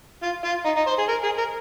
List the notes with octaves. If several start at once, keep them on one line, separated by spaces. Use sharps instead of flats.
F4
F4
D#4
D#4
C5
G#4
A#4
G#4
A#4